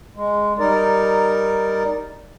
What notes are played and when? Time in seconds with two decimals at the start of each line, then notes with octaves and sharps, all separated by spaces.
0.16 G#3
0.59 G3 D#4 A#4 D5